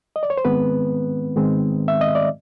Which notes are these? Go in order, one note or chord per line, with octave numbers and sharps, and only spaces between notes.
D#5
D5
C#5
C5
G#2 D#3 G#3 B3 C4 B4
G#2 D#3 G#3 C4
E5
D#5
D5